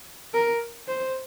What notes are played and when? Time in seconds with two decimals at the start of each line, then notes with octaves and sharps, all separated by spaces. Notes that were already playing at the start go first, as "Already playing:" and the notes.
0.34 A#4
0.88 C5